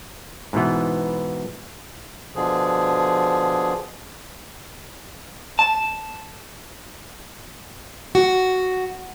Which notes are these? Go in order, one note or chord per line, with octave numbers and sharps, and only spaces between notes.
G#2 B2 E3 B3
B2 D3 F3 G#4
A5
F#4